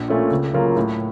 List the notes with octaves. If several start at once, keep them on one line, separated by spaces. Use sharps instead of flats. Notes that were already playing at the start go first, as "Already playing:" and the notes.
Already playing: A#1
A#2 A3 C#4 F4
C#2
C#3 F#3 A#3 F4
A2